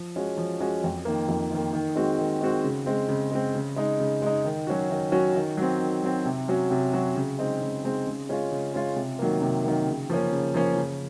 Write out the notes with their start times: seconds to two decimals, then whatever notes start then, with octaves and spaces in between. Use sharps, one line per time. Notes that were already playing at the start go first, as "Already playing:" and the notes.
Already playing: F3
0.16 G#3 C#4 F#4
0.37 F3
0.60 G#3 C#4 F#4
0.84 F2
1.05 D#3 A#3
1.28 F2
1.51 D#3 A#3
1.73 D#3
1.96 G#3 C4 F#4
2.18 D#3
2.41 G#3 C4 F#4
2.64 C#3
2.86 G#3 C4
3.09 C#3
3.31 G#3 C4
3.55 C#3
3.76 G#3 D#4
4.00 C#3
4.22 G#3 D#4
4.45 D#3
4.67 F#3 C#4 F#4
4.90 D#3
5.12 F#3 C#4 F#4
5.35 D#3
5.57 F#3 C4
5.81 D#3
6.02 F#3 C4
6.25 C3
6.48 F#3 C#4 F#4
6.71 C3
6.93 F#3 C#4 F#4
7.16 C#3
7.39 G#3 C4 D#4
7.62 C#3
7.84 G#3 C4 D#4
8.07 C#3
8.29 G#3 C#4 F4
8.51 C#3
8.74 G#3 C#4 F4
8.96 C3
9.19 D#3 F#3 A#3
9.41 C3
9.64 D#3 F#3 A#3
9.87 C#3
10.10 F3 A#3 C#4
10.32 C#3
10.54 F3 A#3 C#4
10.77 C#3